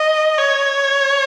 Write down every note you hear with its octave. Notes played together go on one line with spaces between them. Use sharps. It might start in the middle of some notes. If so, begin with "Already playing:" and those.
Already playing: D#5
C#5